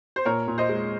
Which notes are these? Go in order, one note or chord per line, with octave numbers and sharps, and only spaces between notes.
C5
A#2 A#4 C#5
A#2
C5 D#5
G#3